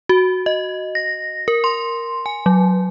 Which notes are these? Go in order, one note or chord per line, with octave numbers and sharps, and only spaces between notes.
F#4
D#5
A#6
A#4
C6
G#5
F#3